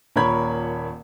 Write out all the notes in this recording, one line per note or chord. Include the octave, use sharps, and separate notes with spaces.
D#1 A#2 A#4 C#5 B5 G#6